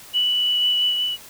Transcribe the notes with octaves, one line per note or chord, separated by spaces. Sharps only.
F#7